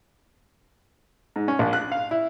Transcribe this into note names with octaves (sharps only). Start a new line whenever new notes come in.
G#2
C#4
A#1
F#6
F5
E4